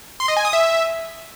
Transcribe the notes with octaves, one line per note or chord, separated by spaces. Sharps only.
C6
D#5
G#5
D#6
E5